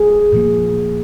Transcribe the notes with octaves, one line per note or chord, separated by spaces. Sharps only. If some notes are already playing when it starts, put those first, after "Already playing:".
Already playing: G#4
A#2 F3 A#3